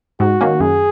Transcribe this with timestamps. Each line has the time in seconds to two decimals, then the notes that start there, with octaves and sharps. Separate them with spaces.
0.20 G#2 F#4
0.41 D#3 A#3 C#4
0.60 F#2 G#4